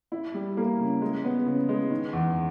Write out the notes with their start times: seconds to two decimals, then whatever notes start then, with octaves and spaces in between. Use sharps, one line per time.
0.12 E4
0.34 G3
0.57 A#3
0.80 C#3
1.02 G#3
1.24 B3
1.46 C#3
1.69 G#3
1.90 D#3
2.13 E2